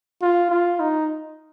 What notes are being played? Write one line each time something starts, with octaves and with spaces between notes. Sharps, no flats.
F4
F4
D#4